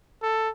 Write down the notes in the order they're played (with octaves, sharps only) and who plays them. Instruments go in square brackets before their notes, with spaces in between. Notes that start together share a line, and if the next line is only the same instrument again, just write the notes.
[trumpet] A4